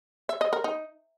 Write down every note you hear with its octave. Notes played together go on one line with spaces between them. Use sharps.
E5
D#5
A#4
D#4